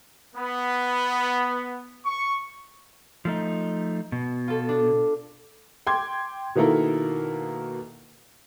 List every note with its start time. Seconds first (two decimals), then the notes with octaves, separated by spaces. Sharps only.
0.36 B3
2.06 C#6
3.25 F3 A3 D#4
4.12 B2
4.48 F4 A4
4.69 D4
5.87 G5 C6 D6 G#6
6.55 B2 D#3 A#3 E4 A4 A#4